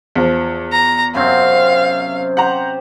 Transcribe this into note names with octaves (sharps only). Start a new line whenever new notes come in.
E2 F3
A#5
F#2 C3 C4 F5
G4 C5 F#5 A#5